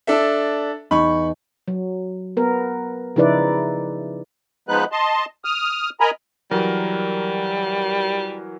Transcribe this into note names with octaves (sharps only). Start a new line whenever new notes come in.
D4 A4 E5
E2 D#4 B5 C#6
F#3
B3 A#4
C#3 F3 D#4 E4 B4 D5
F3 G#3 B3 D#4 B4 F#6
D#5 A5 C6
D#6 F6
A#4 D#5 G#5 A#5 B5
E3 F#3 G3 A#4